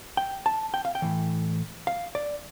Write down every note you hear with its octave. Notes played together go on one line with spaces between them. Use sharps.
G5
A5
G5
F5
G5
A2 E3
F5
D5